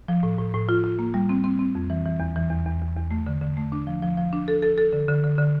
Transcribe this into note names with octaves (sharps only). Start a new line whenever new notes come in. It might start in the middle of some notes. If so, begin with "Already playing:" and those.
F3
A2
A2
A2
F4
F4
A#3
G3
C4
C4
C4
F2
E3
E3
E2
E3
E2
E2
E2
E2
A3
D3
D3
A3
D4
F3
F3
F3
D4
A4
A4
A4
D3
D3
D3
D3